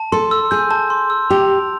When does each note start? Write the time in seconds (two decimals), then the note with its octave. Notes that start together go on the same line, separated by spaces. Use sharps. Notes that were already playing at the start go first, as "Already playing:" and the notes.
Already playing: A5
0.12 A4 C6
0.31 E6
0.51 G#4 G6
0.71 A5
0.90 C6
1.10 E6
1.30 G4 F7